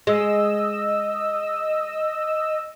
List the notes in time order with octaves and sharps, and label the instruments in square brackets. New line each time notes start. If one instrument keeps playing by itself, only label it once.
[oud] G#3 [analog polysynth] D#5 E6